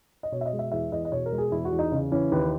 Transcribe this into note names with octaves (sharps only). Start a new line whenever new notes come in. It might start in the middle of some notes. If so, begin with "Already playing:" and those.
D#5
B2 C#5
E5
D#5
G#3
E5
E2 E5
E2 D#5
D#5
B2 C#5
A#4
G#3
G#4
E2 E4
F#4
E2
D#4
C#3
E3 C#4
D#2 B4